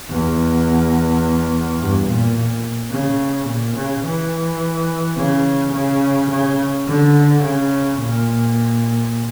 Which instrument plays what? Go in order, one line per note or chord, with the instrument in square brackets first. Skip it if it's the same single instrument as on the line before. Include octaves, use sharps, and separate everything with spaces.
[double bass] E2
G2
A#2
A#2
C#3
A#2
C#3
E3
C#3
C#3
C#3
D3
C#3
A#2